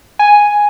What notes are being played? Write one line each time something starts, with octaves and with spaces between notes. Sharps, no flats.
G#5